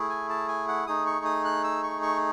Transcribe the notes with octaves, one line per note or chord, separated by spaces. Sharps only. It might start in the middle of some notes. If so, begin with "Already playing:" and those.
Already playing: A3 E4 G#4
G#5
A5
G#5
F#5
A3 D#4 G#4 D#6
C#6
D#6
F#6
E6
C#6
C#6